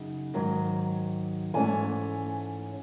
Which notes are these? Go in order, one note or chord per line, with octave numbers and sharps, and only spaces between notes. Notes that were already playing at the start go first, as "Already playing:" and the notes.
Already playing: F#2 C#3 D#4
G#2 D#3 F#3
G#2 E3 A3 C#4 G#5